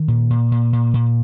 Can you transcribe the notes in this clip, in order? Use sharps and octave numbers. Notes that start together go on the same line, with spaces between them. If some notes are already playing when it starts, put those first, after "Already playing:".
Already playing: D#3
A#2
A#2
A#2
A#2
A#2